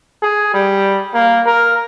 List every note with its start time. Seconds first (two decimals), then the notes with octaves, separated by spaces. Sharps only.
0.22 G#4
0.54 G3
1.14 A#3
1.46 A#4